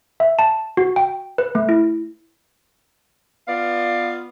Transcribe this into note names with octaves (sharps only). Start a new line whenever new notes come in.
E5
A5
F#4
G5
B4
A3
E4
B3 F4 D5 F5